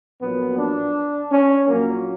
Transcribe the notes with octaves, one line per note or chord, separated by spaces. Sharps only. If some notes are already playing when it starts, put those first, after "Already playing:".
A#1 A#2 F#3 B3
D4
C#4
A#1 A#2 F#3 A#3